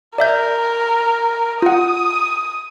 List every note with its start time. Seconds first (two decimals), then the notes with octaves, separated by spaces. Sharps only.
0.18 A#4 D5 E5 G6
1.62 F4 F#5 D#6